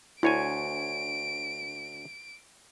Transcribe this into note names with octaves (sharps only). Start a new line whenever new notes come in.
D2 E4 C#5 G#5 D7